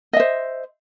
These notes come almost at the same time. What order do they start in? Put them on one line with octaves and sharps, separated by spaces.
D#5 E5 C5